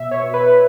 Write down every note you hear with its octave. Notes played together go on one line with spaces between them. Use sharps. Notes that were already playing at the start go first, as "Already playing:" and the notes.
Already playing: B2 E5
C#5
B2
B4